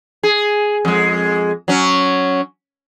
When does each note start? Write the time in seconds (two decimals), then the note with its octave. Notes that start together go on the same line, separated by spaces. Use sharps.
0.23 G#4
0.85 F2 G#3
1.68 F#3 C#4